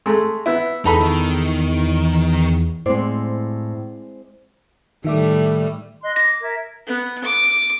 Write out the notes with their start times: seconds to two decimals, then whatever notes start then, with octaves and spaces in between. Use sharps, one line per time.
0.06 G#3 A3
0.46 B3 E4
0.85 E2 D#4 A4 B5
1.01 D#3
2.86 A2 G#3 C4 C5 D5
5.05 A2 D#3 G3 A3 E5 D6
6.03 D#5 C6 F#6
6.16 D6 A#6
6.42 A#4 E5 G#6
6.87 B3
7.23 D6